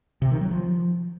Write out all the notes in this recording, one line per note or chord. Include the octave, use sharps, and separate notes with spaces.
C3
D#3
F#3
F3